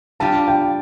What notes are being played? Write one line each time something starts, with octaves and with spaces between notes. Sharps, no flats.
G3 D4 F4 A5
G5